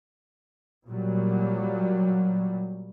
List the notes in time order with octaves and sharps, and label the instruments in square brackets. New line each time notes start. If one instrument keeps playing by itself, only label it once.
[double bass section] A#2 F#3 G3